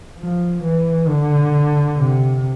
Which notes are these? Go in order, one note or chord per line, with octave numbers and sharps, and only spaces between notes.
F3
E3
D3
C3